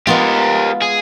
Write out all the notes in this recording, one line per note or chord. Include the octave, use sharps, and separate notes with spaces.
G#3 B3 F4 G4 A#4
G#4